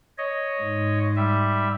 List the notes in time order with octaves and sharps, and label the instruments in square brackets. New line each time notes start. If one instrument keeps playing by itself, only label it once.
[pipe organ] C#5 D#5
[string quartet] G#2
[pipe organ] G3 E5